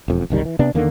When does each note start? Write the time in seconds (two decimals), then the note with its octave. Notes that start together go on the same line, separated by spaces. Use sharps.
0.08 E1 F2
0.30 F#1 C2 D#3 G3
0.45 E3
0.59 C3 B3 D4
0.74 E2 D3 D#3 A#3